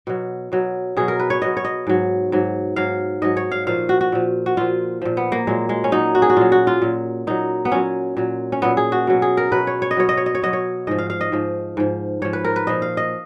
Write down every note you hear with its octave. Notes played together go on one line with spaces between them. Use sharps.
B2 F#3
B2 F#3
B2 F#3 G#4
A#4
B4
C#5
B2 F#3 D#5
C#5
D#5
G#2 F#3
G#2 F#3
G#2 F#3 F5
G#2 F#3 D#5
C#5
F5
A#2 F3 F5
F#4
F#4
A#2 F3
F#4
A#2 F3 F4
A#2 F3
B3
A#3
A#2 F#3 G#3
G#3
C#4
A#2 F#3 D#4
F#4
G#4
F#4
A#2 F#3 F4
F#4
F4
A#2 F#3
A#2 F#3 D#4
B3
A#2 F#3 C#4
A#2 F#3
C#4
A#2 F#3 B3
G#4
F#4
B2 F#3
G#4
A#4
B2 F#3 B4
C#5
C#5
D#5
B2 F#3 C#5
D#5
C#5
D#5
C#5
B2 F#3 D#5
C#5
G#2 F3 D#5
F5
F5
D#5
G#2 F3
G#2 F3
G#2 F3 C#5
B4
A#4
B4
A#2 F3 D#5
F5
D#5